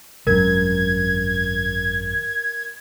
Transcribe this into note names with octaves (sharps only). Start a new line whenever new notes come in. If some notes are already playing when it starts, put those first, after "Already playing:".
G#1 F#2 A#4 G#6